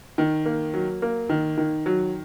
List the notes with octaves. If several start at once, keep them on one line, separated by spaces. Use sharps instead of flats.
D#3
A#3
F#3
A#3
D#3
D#3
F#3